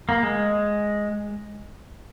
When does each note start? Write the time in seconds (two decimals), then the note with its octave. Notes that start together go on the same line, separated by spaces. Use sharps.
0.09 A#3
0.23 G#3